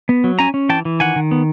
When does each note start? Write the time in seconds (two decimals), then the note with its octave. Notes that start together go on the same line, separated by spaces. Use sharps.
0.09 B3
0.24 F#3
0.39 C#4 G#5 A#5
0.54 C#4
0.69 E3 G5 A5
0.85 E3
1.00 D#3 F#5 G#5
1.16 D#3
1.31 B3